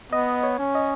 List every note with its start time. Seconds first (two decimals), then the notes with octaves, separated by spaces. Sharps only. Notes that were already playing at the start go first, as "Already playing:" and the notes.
0.13 B3 D#5
0.43 C#5
0.59 C#4
0.75 D#5